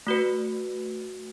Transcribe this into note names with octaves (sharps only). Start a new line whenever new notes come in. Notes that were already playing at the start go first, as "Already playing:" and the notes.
A3 F#4 B4